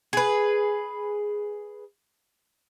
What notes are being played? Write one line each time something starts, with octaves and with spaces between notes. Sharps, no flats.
G#4 B4